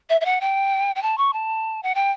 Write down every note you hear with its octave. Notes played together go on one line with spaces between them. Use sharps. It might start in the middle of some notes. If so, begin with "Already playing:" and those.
E5
E5
F#5
G5
G5
A5
C#6
A5
F#5
G5